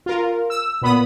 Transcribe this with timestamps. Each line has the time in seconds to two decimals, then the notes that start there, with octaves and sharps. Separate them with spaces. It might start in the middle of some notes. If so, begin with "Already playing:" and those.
0.06 F4 A#4
0.50 E6
0.82 A#2 B3 B5 D#6